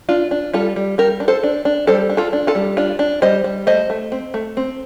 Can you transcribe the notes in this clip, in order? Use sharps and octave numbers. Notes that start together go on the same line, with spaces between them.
D4 F4
D4
G3 F4 A4
G3
G3 G4 A#4
D4
A4 C5
D4
D4
G3 A4 C5
D4
F4 A4
D4
F4 A4
G3
D4 F4
D4
G3 C5 D#5
G3
A3 C5 D#5
A3
C4
A3
C4